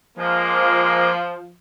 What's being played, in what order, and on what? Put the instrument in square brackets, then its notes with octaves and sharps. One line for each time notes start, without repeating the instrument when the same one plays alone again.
[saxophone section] F3 [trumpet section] G#3 A#3